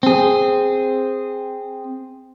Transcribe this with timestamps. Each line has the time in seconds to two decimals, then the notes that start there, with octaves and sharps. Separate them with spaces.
0.03 C4 G#4